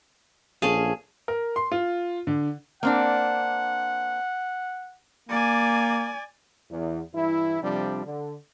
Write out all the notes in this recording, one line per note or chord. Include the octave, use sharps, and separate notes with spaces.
A#1 C#4 G#4 A4 F5
A#4
C6
F4
D3
A#3 C4 D4 F#5
A#3 D5 G#5
E2
G2 E3 E4
F2 C3 F3 G3 D4
D3